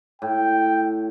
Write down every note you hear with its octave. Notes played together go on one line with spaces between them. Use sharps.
A2 G5